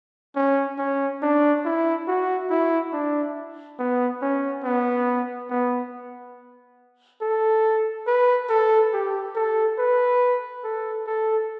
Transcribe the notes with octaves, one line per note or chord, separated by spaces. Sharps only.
C#4
C#4
D4
E4
F#4
E4
D4
B3
C#4
B3
B3
A4
B4
A4
G4
A4
B4
A4
A4